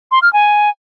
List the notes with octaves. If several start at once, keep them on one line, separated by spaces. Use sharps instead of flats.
C6
F6
G#5